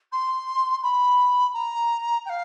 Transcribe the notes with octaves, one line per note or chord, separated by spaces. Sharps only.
C6
B5
A#5
G5
F5